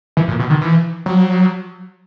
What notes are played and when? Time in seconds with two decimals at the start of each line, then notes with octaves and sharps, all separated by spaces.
0.17 E3
0.28 A#2
0.39 B2
0.50 D#3
0.61 E3
1.06 F#3